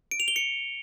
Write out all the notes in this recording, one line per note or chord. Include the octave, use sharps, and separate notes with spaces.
D7
F7
G7
C#7